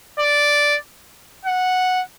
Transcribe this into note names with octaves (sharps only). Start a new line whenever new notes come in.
D5
F#5